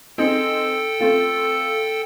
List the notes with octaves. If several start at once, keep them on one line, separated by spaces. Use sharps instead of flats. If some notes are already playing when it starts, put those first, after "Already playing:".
C4 D#4 G#4 A4 G5 E6
A3 C4 F4